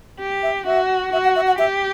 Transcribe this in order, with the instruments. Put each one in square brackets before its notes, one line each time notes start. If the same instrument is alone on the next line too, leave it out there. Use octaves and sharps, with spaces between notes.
[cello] G4
[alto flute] E5
[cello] F#4 [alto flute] E5
[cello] F#4 [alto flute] E5
[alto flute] F#5
E5
F#5
[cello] G4 [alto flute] E5